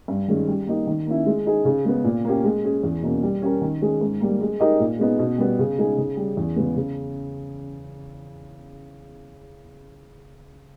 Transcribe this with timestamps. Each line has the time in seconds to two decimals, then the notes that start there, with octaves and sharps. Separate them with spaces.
0.08 G2
0.28 D#3 G#3 C#4
0.48 G3
0.67 A#3 D#4 G4
0.87 D#3
1.06 A#3 C#4 E4
1.26 G#3
1.46 D#4 G#4
1.65 C#3
1.85 G#3 B3
2.04 A#2
2.25 A#3 C#4 G4
2.45 G#3
2.64 C#4 G#4
2.83 E2
3.03 B2 A#3 C#4
3.23 G3
3.42 C#4 G4 A#4
3.61 D#3
3.81 G#3 C#4 G#4
4.01 G#2
4.20 G3 A#3
4.41 G#3
4.60 D#4 G4 A#4 D#5
4.80 A#2
4.99 G#3 B3 D#4
5.19 B2
5.38 G3 B3
5.59 C#3
5.78 G#3 D#4 G#4
5.98 C#3
6.17 G3 C#4
6.37 E2
6.56 C#3 G#3 B3
6.76 C#3